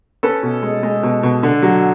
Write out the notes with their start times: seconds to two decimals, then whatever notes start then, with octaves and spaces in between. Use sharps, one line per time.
0.23 C#4 A4 B4
0.43 B2
0.63 G#3
0.83 G#3
1.03 B2
1.23 B2
1.43 D3
1.62 F#3